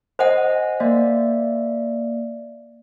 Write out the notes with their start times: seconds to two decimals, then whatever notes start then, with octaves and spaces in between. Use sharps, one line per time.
0.19 C5 D#5 F#5 G#5
0.80 A#3 D5 E5